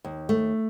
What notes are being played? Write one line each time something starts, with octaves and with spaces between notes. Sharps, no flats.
D#2
A3